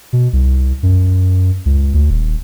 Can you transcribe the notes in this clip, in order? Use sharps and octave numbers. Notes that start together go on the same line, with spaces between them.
B2
C2
F#2
C#2
D2
D#1